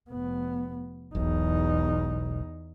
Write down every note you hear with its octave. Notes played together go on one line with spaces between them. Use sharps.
F1 B3
E1 B1 E2 D#4